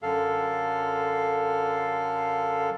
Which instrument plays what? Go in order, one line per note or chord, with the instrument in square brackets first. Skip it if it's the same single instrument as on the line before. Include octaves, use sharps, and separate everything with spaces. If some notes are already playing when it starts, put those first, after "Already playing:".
[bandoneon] F#2 D3 A4 F5